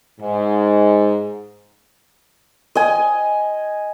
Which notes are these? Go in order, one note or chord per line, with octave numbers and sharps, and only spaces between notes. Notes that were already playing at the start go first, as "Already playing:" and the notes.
G#2
D#5 G#5